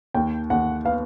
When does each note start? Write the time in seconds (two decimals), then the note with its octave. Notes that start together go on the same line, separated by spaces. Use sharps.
0.14 D#2 G5
0.50 D#2 F#5
0.85 B3 F5